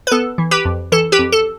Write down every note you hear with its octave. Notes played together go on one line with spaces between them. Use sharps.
B4
B3 A4
E3
G4 B4
F2
E3 A4
G4 B4
F2
A4